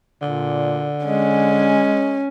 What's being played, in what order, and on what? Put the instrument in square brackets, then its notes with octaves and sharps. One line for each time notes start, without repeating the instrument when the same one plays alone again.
[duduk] A#2 [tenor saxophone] D3
[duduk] G#3 [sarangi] C#4